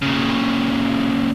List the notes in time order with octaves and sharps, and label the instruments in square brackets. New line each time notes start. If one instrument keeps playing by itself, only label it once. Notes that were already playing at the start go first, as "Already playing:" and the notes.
[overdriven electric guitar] A#2 C#3